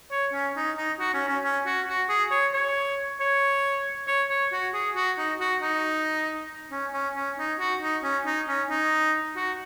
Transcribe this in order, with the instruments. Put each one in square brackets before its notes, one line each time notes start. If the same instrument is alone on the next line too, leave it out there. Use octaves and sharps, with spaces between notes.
[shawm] C#5
C#4
D#4
D#4
F#4
C#4
C#4
C#4
F#4
F#4
G#4
C#5
C#5
C#5
C#5
C#5
F#4
G#4
F#4
D#4
F#4
D#4
C#4
C#4
C#4
D#4
F#4
D#4
C#4
D#4
C#4
D#4
F#4